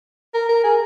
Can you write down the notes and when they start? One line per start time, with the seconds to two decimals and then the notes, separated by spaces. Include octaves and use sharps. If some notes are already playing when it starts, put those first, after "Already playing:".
0.34 A#4
0.49 A#4
0.64 G#4